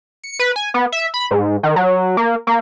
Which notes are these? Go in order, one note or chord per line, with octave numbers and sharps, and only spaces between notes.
C#7
B4
G#5
B3
E5
B5
G#2
D#3
F#3
A#3
A#3